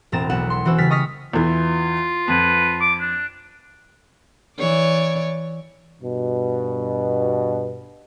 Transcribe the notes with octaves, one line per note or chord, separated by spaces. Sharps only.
E1 A2 C4 A#5 A6 E7
B1 F#5 E7
C6 C#7
E3 C#4 F#4 C5 E6
C#3 G3 F6 A6 B6
D#5 C#6 D#6 F6 A#6 B6
E2 E3 F4
F2 B4
D6
D4
E3 C#5 D5
G2 B2